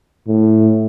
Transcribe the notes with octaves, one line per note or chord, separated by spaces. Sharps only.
A2